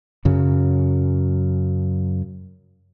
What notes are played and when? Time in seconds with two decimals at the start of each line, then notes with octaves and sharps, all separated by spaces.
0.25 F#2 C#3 F#3